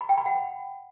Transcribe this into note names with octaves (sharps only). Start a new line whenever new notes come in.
B5
G5
B5
F#5